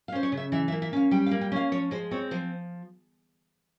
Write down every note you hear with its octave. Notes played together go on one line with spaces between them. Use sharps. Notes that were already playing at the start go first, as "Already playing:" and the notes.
F5
C#4 C5
C#5
C#3
E5
E3 E5
E5
A#3
E5
C#4 F5
G3 G5
F5
A#3
G5
C#4 F5
F3 C#5
G#3 C5
C4 C#5
F3 C5